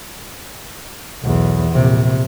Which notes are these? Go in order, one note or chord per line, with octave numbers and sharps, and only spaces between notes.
B1 E2
A#1 C3